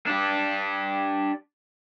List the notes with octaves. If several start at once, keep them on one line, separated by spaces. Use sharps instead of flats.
D4 G4